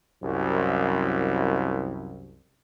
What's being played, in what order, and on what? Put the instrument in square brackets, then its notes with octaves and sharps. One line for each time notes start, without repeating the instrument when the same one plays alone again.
[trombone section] C2 F#2